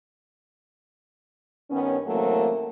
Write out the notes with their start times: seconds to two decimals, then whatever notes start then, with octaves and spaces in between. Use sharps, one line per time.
1.70 G2 D#3 B3 C#4
2.07 C3 E3 F#3 A3 A#3